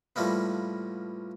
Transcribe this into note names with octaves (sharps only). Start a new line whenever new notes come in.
A2 F3 G3 A#3 B3